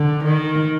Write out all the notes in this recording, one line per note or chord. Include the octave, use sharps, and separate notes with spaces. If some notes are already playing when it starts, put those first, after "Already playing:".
Already playing: D3
D#3